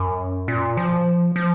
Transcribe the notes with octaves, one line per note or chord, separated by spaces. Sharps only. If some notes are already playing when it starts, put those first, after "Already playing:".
Already playing: F#2
A#2
F3
F3